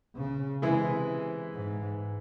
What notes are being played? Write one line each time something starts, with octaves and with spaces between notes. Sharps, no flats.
C#3
C3 E3 G#3 E4 G#4
G#2